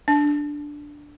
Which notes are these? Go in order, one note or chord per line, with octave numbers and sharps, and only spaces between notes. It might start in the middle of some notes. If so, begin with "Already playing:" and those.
D4